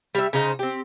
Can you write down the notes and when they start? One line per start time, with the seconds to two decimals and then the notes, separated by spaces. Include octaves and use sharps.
0.15 G3 E5
0.33 C#3 D#4 C5
0.59 C4 G4